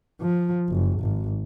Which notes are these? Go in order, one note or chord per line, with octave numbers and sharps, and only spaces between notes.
F3
F#1
G#1